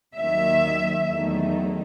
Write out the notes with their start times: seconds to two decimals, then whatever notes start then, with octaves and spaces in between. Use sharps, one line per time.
0.19 D#2 D#3 F#3 E5
1.11 E2 D#3 F#3 A3 D#4